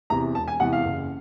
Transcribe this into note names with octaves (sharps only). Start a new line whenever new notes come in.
E2 C3 A#5
E1 A5
G#5
E2 C3 F#5
F5
F#1